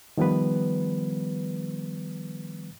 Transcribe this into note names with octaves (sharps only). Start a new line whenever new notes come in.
D#3 F3 G3 B3 B4